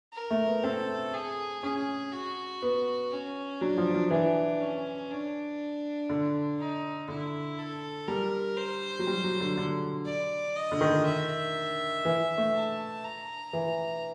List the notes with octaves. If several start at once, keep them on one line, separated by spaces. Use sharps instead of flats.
A#4
A3
B3
C4 A4
G#4
C#4 G#4
F#4
B3
C#4
F#3 D4
F3
F3
E3 D4
C#4
D4
D3
D#4
D3 E4
A4
G3 A#4
C5
F#3
G3
F#3
D3
D3
D5
D#5
D3
D#3
E5
E3
A3
A5
A#5
E3